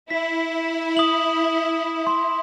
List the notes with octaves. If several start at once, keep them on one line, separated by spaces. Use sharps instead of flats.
E4 B6
D#6 F#7
C6